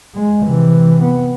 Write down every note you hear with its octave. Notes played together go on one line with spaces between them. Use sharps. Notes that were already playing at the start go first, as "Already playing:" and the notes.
G#3
C3 E3
B3